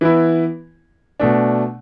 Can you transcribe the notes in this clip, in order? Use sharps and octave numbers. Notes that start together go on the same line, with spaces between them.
E3 B3 E4
B2 A3 D4